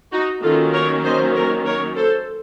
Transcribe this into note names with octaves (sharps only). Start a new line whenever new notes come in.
D#4 F#4
D#3 F#3 A#3 C#4 F4 A4
A#4 C#5
C5 D#5
A#4 C#5
A#4 C#5
A4 C5